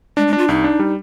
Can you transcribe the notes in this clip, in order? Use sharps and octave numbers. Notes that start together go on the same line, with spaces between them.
G#3 D4
G#3
D4
F4
C2 D#4
D4
G3